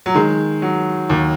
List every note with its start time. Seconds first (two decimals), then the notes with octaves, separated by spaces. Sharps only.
0.06 F#3
0.14 D#3 G#3
0.62 F#3
1.09 D#2